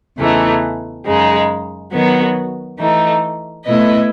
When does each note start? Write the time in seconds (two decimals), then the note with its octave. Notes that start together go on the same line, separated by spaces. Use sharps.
0.18 E2 C#3 E3 A3 D#4
1.05 F#2 C#3 G#3 D#4
1.92 D#3 F#3 B3 F#4
2.79 E3 A3 D#4
3.65 B2 A3 E4 B4 D#5